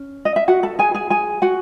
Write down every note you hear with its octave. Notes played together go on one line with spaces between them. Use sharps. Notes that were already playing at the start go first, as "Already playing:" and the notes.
Already playing: C#4
D#5
E5
F#4 F#5
A4 A5
G#4 G#5
G#4 G#5
G#4 G#5
F#4 F#5